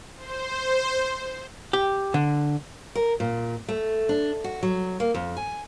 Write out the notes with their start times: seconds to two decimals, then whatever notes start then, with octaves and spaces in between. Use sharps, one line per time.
0.16 C5
1.73 G4
2.14 D3
2.95 A#4
3.20 A#2
3.68 A3
4.09 D4
4.44 F#4
4.63 F#3
5.00 A#3
5.14 F2
5.37 G#5